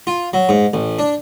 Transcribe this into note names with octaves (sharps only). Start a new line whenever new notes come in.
F4
F#3
G#2
A1
D4